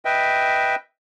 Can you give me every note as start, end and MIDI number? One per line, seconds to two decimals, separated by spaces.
0.05 0.75 71
0.05 0.75 75
0.05 0.75 76
0.05 0.75 79